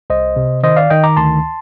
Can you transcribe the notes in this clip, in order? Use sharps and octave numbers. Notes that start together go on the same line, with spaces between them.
C2 C5 D#5
C3
D#3 C5 D#5
D5 F5
D#3 D#5 G5
A#5 D6
D2 A5 C6